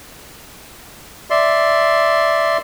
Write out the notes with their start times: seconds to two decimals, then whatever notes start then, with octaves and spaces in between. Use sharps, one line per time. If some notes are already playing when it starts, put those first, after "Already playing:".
1.30 D5 E5 C6